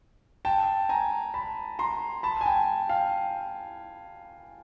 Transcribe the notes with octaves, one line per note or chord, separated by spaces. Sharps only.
G5 A5
G#5 A#5
A5 B5
A#5 C6
A5 B5
G#5
G5 A5
F5 G5